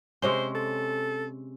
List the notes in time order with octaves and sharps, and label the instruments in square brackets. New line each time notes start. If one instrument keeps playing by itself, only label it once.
[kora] C3 G#3 C#4 [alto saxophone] C5
[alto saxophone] A4